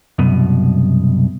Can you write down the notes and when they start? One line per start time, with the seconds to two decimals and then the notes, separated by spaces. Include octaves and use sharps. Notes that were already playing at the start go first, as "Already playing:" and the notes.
0.19 C2 F#2 B2